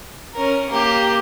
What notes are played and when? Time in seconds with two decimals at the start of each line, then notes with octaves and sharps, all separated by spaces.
0.34 C#4 A#4
0.69 A#3 G4